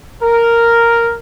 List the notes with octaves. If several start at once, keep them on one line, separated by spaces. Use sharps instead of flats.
A#4